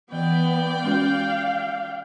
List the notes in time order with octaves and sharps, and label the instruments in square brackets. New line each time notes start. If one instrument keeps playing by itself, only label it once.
[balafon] E3 [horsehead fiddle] B3 [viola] D5 G5
[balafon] G#3 C#4 F#4 [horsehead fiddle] F5